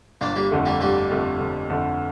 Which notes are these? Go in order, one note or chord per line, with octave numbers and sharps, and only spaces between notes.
G1 A#3 D4
G3 A#3
F2 D3 A3
G3 A#3
G1 G3 A#3
F2 D3 A3
G1
F2 D3 A3